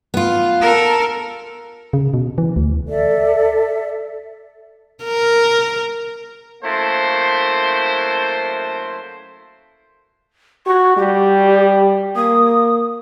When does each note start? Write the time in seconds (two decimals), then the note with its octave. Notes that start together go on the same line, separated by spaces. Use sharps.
0.14 B3 F4
0.61 A4 A#4
1.93 C#3
2.14 B2
2.38 E3
2.56 D2
2.88 A4 D5 E5
5.04 A#4
6.63 F#2 A3 A#3 E4 C5
10.66 F#4 C#6
10.97 G3 G4
12.16 A#3 D#6